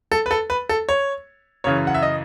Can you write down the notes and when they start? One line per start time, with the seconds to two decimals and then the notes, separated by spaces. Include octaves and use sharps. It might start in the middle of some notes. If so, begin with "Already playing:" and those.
0.12 A4
0.26 B4
0.31 A4
0.50 B4
0.69 A4
0.89 C#5
1.64 F#2 C#3 E3 C#5
1.87 F#5
1.94 E5
2.02 D#5